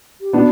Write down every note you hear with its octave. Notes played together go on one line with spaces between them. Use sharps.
G4
B3 D4 F#4